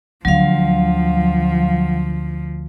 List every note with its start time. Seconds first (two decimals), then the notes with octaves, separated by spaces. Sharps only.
0.25 D2 D3 F3 F#3 F5